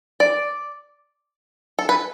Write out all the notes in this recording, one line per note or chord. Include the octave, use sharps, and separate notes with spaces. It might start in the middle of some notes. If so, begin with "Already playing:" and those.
D5
A4
B4